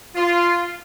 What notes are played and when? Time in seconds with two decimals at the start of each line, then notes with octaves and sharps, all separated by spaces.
0.16 F4